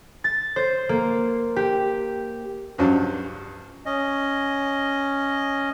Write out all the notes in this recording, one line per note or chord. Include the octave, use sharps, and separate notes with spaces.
A6
C5
A#3
G4
C#2 G2 C#3 F3 F#3
C#4 D#5